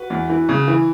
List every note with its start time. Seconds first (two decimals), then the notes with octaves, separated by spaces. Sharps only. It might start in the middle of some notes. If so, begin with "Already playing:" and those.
Already playing: F#4 B4
0.10 E2
0.29 E3
0.49 C#3
0.68 E3